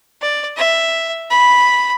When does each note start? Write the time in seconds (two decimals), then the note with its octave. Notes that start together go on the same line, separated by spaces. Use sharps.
0.22 D5
0.57 E5
1.30 B5